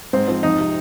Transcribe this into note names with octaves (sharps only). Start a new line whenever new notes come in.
G#2 C4
F3 C4
F2 D#4
C3